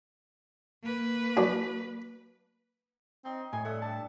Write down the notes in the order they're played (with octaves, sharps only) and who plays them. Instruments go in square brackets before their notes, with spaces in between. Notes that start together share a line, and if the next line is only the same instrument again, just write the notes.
[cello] A#3 B4
[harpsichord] F#2 D4
[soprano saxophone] C4 [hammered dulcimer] D#4
[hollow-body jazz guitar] A2 [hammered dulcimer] C#5 C6 [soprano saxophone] G#5
[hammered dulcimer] G2 E5 F#5 [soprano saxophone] A3
[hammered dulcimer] G3 D4 [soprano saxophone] A5